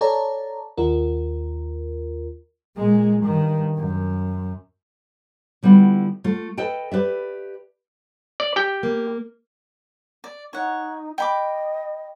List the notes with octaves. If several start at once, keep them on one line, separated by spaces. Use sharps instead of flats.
A4 C#5 D5 A5 A#5
D#2 F4 A#4
A#2 G#3
G2 D#3
F#2
D3 G3 B3 E4 F4
A3 F4
A4 B4 D#5 G5 A5
G4 B4 D5 E5
D5
G4 G5
A#3
D5
D#4 C#5 F#5
D#5 G5 B5 D6